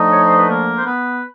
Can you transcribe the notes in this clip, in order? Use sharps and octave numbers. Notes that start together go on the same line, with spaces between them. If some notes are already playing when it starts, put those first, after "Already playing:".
Already playing: D3 F3 A3 D#4 D#5
C#5
C5
B4
A#3 A#4
C5
B3 B4